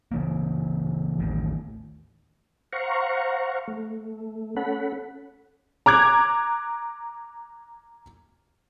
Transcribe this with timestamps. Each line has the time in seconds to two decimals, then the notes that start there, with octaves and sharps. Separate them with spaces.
0.12 C#3 E3 A#3
1.19 A1 D#2 A2
2.73 C5 F5 F#5 A#5 C#6
3.68 A3
4.56 C#4 A4 F#5 B5
5.86 A#5 D6 F#6 G#6